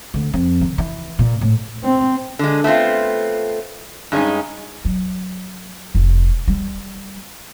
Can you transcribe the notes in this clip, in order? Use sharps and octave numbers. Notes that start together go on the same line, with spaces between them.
D2
F2
D#3
E3
A#2
A2
C4
D3 G#3
A3 B3 C4 F4
G2 G#3 C#4 D#4
F#3
F1
G3